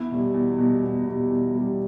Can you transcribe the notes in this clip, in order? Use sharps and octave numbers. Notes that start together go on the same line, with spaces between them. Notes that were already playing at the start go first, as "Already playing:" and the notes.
Already playing: E2 E4
B2 G3
E2
B2 G3
E2
B2 G3
E2
B2 G3